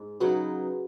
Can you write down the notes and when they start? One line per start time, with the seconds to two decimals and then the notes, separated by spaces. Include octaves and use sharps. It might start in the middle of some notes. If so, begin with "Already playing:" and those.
Already playing: G#2
0.20 C#3 F#3 D#4 F#4 B4